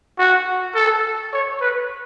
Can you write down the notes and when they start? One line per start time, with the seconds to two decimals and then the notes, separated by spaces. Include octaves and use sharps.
0.19 F#4
0.75 A4
1.33 C#5
1.61 B4